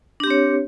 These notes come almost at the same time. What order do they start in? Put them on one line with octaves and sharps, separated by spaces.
D4 G4 C4 C#5